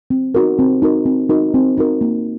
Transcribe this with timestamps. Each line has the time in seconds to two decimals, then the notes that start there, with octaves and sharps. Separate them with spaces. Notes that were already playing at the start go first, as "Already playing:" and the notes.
0.10 C4
0.35 D#4 F#4 A#4
0.59 C4
0.82 D#4 F#4 A#4
1.06 C4
1.30 D#4 F#4 A#4
1.54 C4
1.77 D#4 F#4 A#4
2.01 A#3